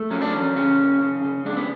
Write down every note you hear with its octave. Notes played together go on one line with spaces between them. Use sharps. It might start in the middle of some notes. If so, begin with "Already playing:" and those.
Already playing: A3
F#3 C#4
D4
E2 C#4
C#3 C#4
F#2
C#3
C#3
G#3 D4
B3